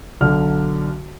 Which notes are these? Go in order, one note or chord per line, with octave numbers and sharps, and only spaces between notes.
B1 D3 F6